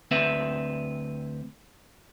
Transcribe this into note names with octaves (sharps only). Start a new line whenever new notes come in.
D2 C4 B4 E5